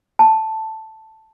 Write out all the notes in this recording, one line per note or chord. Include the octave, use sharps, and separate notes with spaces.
A5